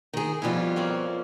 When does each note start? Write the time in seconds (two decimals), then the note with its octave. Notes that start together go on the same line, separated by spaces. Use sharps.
0.13 D#3 G#4
0.42 F2 B2 G3 E4 F4
0.76 A#3 C4 C#4